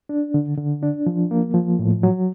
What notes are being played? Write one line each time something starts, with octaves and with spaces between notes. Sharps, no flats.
D4
D3
D3
D4
F3
A#3
F3
A2
F#3